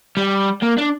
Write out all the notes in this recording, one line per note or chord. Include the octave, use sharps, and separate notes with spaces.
G3
A#3
D4